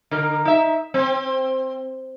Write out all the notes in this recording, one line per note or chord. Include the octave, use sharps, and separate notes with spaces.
D3 A#4
D#4 E5
C4